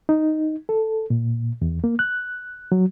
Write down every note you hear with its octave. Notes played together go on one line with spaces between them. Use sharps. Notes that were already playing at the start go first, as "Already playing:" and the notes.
D#4
A4
A#2
E2
A#3
F#6
F#3